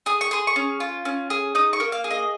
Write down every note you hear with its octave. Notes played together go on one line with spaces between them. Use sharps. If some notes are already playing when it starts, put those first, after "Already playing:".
G#4 D#6
C#6
G#4 C6
C#6
C#4
F4
C#4
G#4
D#4 D#6
C#6
A#3
F5
G#4
D#5